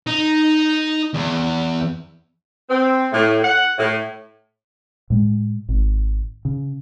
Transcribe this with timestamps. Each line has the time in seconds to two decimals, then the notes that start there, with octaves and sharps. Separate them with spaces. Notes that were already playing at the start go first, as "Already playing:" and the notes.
0.07 D#4
1.15 E2
2.70 C4
3.12 A2
3.43 F#5
3.78 A2
5.10 A2 G#3
5.69 G#1
6.45 C#3